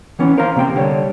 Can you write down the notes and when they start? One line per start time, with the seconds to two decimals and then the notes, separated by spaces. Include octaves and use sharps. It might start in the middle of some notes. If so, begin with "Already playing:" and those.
0.19 D#3 E3 B3 C#4
0.38 A#4 C5 F5 A#5
0.56 C3 A#3 G5 C6
0.76 D3 G3 C#5